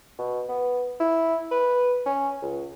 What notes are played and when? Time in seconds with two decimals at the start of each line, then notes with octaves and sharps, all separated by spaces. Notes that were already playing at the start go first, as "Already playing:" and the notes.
0.19 B2
0.49 B3
1.00 E4
1.52 B4
2.06 C#4
2.42 C#2